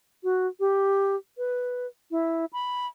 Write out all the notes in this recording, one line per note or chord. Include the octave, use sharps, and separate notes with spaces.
F#4
G4
B4
E4
B5